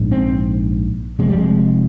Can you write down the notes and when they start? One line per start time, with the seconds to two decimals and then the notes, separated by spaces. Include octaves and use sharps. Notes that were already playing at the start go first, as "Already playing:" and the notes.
Already playing: A#1 G#2
0.11 C4
1.19 F1 F2 C3 G#3
1.29 G3
1.38 G#3